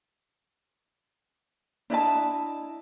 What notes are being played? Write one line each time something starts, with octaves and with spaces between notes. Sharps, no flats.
D4 E4 D#5 A5